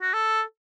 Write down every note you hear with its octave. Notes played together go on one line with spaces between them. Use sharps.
F#4
A4